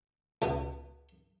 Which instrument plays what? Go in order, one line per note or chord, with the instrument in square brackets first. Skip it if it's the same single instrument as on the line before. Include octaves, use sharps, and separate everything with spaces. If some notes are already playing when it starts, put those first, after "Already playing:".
[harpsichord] C#2 B2